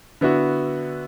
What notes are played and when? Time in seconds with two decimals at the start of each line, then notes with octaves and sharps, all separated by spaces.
0.21 D3 B3 E4 F#4